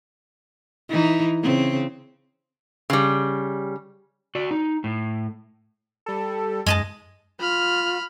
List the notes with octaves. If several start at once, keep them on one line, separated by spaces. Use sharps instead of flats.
E3 D#4
C#3 C4
C#3 G3
F#4 D5
D#4
A2
G3 A4
F#2 G#3 D#5 A5
F4 B5 F6